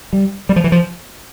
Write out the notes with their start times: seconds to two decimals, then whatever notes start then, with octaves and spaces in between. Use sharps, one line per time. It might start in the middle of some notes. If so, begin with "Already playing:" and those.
0.13 G3
0.49 G3
0.56 F3
0.64 E3
0.72 F3